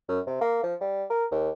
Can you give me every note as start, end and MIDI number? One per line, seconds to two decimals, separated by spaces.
0.08 0.20 42
0.27 0.38 48
0.41 0.60 58
0.64 0.75 53
0.81 1.05 55
1.10 1.25 70
1.31 1.50 39